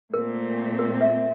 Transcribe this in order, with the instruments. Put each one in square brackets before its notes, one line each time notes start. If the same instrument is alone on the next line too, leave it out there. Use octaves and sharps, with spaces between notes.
[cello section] A#2 A3 C4 [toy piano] A#4
[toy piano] A#4
E5